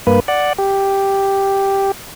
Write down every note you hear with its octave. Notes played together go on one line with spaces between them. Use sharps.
G2 A#3 B4
D5 F#5
G4